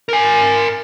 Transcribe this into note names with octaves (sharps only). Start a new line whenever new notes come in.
A#4 G#5